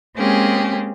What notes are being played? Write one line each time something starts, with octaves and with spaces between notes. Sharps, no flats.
G#3 A#3 C4 C#4 G4 G#4